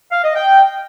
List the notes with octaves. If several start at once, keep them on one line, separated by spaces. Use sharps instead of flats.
F5
D#5
G5